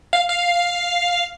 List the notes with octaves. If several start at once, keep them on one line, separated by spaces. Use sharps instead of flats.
F5
F5